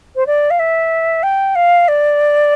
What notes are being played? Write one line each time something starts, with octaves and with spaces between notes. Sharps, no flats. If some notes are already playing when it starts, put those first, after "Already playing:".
C5
D5
F5
E5
G5
F5
D5